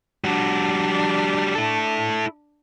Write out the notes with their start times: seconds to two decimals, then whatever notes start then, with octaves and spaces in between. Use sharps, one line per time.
0.24 G3 D4 F#4
1.55 E4 A4